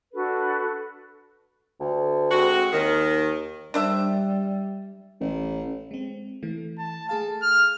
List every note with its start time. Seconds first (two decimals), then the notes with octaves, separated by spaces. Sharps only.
0.13 D4 F#4 A4 B4
1.80 D2
2.31 G#3 C4 F#4
2.73 D#2 D#3
3.74 G3 D4 C5 E5
5.20 A1
5.91 G#3 C4
6.43 E3 A3
6.79 A5
7.09 A3 G#4 F5 A5
7.42 F6